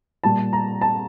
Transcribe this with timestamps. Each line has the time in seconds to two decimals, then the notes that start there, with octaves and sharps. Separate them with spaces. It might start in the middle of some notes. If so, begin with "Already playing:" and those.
0.24 A#2 G3 A5
0.53 A#5
0.81 A5